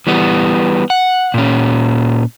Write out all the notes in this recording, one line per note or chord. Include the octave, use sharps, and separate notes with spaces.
E3 G3 B3
F#5
A#2 C#4